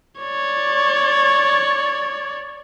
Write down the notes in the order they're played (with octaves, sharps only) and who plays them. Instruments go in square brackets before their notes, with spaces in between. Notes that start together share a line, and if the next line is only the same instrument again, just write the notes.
[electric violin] C#5 D5